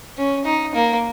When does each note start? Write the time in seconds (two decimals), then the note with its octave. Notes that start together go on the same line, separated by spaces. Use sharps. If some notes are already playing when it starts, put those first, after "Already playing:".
0.18 C#4
0.45 D#4
0.75 A#3